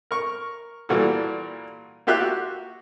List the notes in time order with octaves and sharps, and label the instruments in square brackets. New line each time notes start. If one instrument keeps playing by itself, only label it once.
[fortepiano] A#4 C#6
A#2 E3 G3 F#4 A4
A#3 F4 G4 E5 F#6
F#4